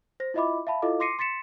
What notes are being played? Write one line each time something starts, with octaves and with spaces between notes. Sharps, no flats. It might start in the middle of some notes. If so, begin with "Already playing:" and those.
C5 A#6
E4 F4 D#5 E5 B5 D6
E5 F5 A5 B5
E4 F4 A4 D#5 F5 D6
C6 D6 A#6 C7 C#7 D#7
C6 A6 B6 C#7 E7